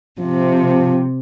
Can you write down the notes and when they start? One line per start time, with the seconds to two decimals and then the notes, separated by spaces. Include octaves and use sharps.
0.19 C3 F3